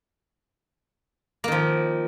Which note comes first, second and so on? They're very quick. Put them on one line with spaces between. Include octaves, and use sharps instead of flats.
A#3 D#3 F3